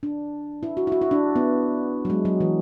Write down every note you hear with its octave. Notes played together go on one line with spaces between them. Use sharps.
D4
E4
F#4
E4
F#4
E4
D4
B3
F#3
G#3
F#3
E3